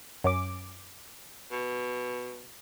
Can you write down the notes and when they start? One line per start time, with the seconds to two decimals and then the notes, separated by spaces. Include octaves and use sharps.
0.24 F#2 C#4 D6
1.51 B2